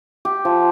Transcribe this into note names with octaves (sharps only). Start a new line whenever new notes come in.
G4
F3